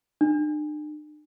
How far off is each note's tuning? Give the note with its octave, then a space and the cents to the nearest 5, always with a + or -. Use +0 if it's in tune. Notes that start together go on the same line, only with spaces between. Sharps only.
D4 +45